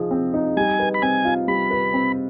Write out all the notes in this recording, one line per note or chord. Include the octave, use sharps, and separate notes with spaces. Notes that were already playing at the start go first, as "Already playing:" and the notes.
Already playing: F3 D#4 G#4
C4
D#4
G3 G#5
B4
B5
C4 G#5
F4
G3 B5
B4
C4